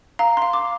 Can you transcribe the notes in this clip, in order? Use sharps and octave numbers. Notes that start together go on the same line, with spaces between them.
F5 A#5
F5 C6
D6